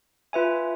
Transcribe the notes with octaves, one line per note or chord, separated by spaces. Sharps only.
F4 B4 E5 G#5